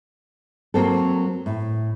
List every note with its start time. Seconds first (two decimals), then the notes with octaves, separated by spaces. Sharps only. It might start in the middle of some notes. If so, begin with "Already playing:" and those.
0.74 F#3 A#3 C4 A4
1.46 A2